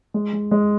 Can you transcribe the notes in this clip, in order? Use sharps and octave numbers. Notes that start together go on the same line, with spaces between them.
G#3
G#3
G#3